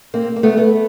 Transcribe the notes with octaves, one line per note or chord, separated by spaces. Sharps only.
A#3 C4
A#3
A3 B3
A3 B3